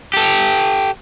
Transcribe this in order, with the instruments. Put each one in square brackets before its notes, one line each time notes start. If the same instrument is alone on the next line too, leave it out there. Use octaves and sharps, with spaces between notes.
[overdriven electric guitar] G4 A4